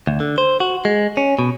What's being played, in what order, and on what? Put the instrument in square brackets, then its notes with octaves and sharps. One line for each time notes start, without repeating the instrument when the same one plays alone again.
[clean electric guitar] D2
D3
C5
F#4
G#3
C#4
B2